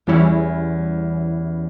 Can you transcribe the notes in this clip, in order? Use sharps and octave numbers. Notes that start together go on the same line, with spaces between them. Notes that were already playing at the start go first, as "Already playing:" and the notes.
E2 E3 G3 C#4 E4